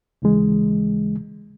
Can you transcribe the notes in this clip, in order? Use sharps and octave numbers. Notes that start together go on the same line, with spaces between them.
D#2 C#3 E3 G#3